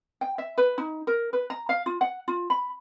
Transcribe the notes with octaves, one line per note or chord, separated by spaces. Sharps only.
G5
E5
B4
D#4
A#4
B4
A#5
F5
F4
F#5
F4
B5